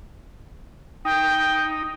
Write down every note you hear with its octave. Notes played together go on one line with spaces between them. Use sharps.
D#4 G5